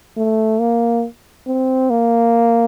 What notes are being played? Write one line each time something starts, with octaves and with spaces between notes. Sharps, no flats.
A3
A#3
C4
A#3